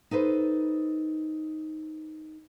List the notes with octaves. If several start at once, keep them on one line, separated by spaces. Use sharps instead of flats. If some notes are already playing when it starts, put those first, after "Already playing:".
D#4 A4 B4 C5